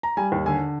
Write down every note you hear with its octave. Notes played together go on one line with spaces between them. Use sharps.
A#5
G3 G#5
D#2
D3 G#5